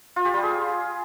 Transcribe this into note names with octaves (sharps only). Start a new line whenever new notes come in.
F4
G4
G3
G#4